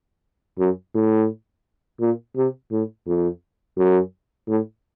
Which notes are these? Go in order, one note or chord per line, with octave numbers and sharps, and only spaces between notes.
F#2
A2
A#2
C3
A2
F2
F#2
A2